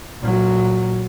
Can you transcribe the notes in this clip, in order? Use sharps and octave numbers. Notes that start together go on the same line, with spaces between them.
A#2 F#3